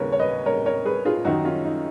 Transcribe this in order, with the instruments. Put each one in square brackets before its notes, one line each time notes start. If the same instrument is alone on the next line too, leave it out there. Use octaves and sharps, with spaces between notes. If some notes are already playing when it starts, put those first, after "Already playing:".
Already playing: [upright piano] D#2 C#3 A#4 B4 C#5
C#5
B4 D#5
A#4 C#5
A#4 C#5
G#4 B4
F4 G#4
F#2 D#3 D#4 F#4
C#4 F4
D#4